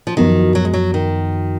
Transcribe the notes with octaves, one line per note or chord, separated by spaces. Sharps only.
F3
F#2 D#3 F3 B3 F#4 A#4
F#3
G#3
F#3
D#3